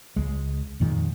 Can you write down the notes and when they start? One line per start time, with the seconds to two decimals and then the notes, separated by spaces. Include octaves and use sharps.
0.16 C#2 G#3
0.80 F2 A#2 D#3 G#3